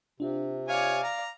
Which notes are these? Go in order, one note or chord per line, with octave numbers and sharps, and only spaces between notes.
C3 D4 F4
C#5 D5 F5 G#5
A#5